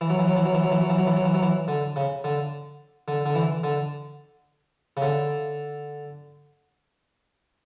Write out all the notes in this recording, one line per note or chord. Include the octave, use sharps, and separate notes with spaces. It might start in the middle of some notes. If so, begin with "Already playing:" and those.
E3
F#3
E3
F#3
E3
F#3
E3
F#3
E3
F#3
E3
F#3
E3
F#3
E3
F#3
E3
D3
C#3
D3
D3
D3
E3
D3
C#3
D3